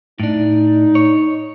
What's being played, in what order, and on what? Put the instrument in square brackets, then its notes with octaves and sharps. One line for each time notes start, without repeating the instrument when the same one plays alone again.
[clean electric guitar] A2 D4 [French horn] D#4
[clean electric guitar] C#5